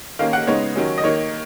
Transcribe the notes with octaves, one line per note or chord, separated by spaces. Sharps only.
D#3 A#3 C#4 F5
F#5
C#3 G#3 B3 D#4 C#5
D#3 F#3 C#4
D#5
D#3 A#3 D#4 C#5